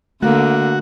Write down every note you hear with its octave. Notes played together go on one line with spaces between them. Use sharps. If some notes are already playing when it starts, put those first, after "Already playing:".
D3 A3 A#3 F#4